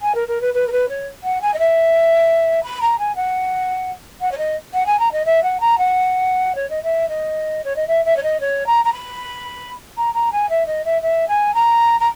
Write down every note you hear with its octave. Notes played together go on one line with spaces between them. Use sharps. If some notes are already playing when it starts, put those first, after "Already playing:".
G#5
A#4
A#4
B4
B4
A#4
B4
C#5
F#5
G#5
D#5
E5
B5
A#5
G#5
F#5
F#5
C#5
D#5
F#5
G#5
A#5
D#5
E5
F#5
A#5
F#5
C#5
D#5
E5
D#5
C#5
D#5
E5
E5
C#5
D#5
C#5
A#5
A#5
B5
A#5
A#5
G#5
E5
D#5
E5
E5
G#5
A#5
A#5